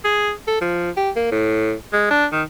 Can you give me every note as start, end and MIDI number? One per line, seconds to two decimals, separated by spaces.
0.04 0.32 68
0.48 0.57 69
0.61 0.90 53
0.97 1.10 67
1.16 1.27 58
1.32 1.74 45
1.93 2.10 56
2.11 2.26 62
2.33 2.42 51